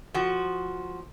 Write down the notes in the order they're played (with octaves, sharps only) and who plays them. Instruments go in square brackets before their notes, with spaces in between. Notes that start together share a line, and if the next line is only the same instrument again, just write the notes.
[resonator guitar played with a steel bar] F3 F#4